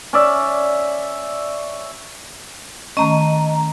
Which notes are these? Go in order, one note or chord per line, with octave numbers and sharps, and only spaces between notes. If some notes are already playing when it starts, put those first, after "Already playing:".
C#4 D5 E5
D#3 A3 C#4 D#5 A#5